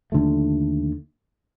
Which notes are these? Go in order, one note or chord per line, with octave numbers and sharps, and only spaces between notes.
D#2 D3 F3 A3